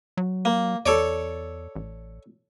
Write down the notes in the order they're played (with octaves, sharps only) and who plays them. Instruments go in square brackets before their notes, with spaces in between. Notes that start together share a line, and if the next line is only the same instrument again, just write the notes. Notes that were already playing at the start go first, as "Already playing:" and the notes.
[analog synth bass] F#3
[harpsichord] A#3
[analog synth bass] E2 [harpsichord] A4 C#5 D5
[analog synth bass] A1